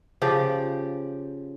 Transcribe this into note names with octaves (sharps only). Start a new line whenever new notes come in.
C#3 F3 G4